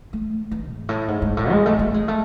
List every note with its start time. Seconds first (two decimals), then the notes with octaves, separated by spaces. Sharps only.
0.13 A3
0.51 E3
0.70 G#2
0.89 A2
1.08 G#2
1.22 G#2
1.37 A2
1.51 G#3
1.66 A3
1.79 A3
1.94 G#3
2.08 A3